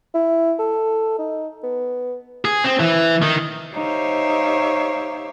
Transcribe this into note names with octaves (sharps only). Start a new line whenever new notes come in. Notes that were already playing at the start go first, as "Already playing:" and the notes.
E4
A4
D#4
B3
G#4
C4
E3
D#3
D#4 G4 C5 C#5 E5 F5